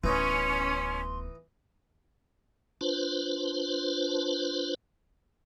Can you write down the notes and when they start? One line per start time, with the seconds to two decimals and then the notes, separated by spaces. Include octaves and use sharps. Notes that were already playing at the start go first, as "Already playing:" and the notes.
0.04 D1 E3 B3 C#4 D#4 C6
2.81 D4 F4 B4 C5